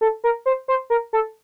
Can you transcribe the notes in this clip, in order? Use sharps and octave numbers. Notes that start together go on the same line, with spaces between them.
A4
A#4
C5
C5
A#4
A4